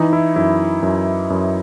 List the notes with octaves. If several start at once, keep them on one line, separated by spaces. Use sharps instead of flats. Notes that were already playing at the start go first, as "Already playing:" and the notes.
Already playing: E3 D#4
E4
F#2 E4
F#2
F#2